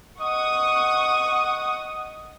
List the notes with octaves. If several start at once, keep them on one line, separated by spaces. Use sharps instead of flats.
D#5 F#5 C#6 D#6